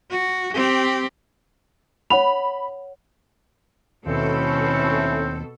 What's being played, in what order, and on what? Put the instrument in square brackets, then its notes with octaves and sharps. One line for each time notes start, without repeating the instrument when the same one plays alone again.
[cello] F#4
C4 G4
[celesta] C#5 F#5 F7 [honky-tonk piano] B5
[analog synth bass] D#2 [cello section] B2 A4 [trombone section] A3 C#4 E4 [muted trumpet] C4